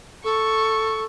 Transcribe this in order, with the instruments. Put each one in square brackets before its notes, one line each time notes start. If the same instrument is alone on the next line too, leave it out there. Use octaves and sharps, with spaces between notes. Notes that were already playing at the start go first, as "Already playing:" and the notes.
[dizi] A4 [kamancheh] C#6